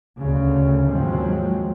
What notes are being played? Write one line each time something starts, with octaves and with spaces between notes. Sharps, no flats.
D2 C#3
D#2 G#2 F3 F#3 G#3 C4